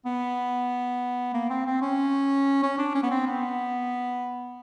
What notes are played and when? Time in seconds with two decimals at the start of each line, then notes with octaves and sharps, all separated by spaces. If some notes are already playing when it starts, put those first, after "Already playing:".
0.06 B3
1.34 A#3
1.50 C4
1.66 C4
1.82 C#4
2.63 C#4
2.78 D4
2.95 C#4
3.03 B3
3.10 C4
3.27 B3